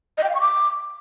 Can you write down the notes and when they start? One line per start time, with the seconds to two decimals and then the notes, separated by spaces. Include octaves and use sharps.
0.18 D#5
0.23 G5
0.29 F5
0.35 C#6
0.41 D6